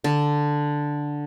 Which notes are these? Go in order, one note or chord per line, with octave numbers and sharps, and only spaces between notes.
D3